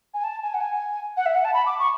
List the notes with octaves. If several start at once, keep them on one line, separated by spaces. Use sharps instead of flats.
G#5
A5
G#5
F#5
G#5
F#5
E5
F#5
A5
B5
D6
C#6